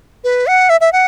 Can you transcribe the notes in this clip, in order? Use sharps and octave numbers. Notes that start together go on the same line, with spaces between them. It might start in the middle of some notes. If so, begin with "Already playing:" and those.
B4
F#5
E5
E5
F#5